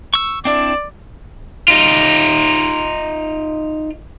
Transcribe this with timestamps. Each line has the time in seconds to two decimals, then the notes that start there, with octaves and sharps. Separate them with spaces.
0.14 C#6 E6
0.45 C4 D4 E4 D5
1.68 D#4 F4